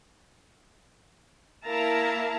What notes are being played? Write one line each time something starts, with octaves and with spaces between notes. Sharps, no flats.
A#3 E4 A#4 F5 A5 A#5